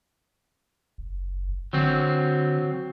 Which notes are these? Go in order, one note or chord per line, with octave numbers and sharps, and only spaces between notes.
F#1
D3 F#3 C4